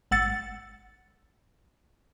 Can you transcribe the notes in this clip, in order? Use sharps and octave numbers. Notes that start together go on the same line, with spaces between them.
G#1 F#5 E6 A6 C#7